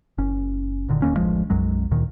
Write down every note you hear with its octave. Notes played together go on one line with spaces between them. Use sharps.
F#1 C#4
F#1 A#2 D3 D#3
D#1 D#2 A#3 C#4
D1 A1 F3 G#3
B1 F#2 F#3 G#3
D2 A#2 D#3